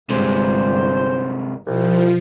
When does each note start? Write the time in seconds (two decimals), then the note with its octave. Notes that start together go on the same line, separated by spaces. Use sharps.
0.10 G1 C3 G#3 C5
1.66 C2 B2 F3